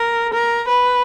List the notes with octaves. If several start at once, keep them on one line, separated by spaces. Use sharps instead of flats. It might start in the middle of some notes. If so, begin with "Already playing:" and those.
Already playing: A#4
A#4
B4